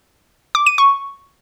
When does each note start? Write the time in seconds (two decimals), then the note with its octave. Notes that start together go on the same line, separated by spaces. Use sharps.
0.55 D6
0.66 D#7
0.78 C#6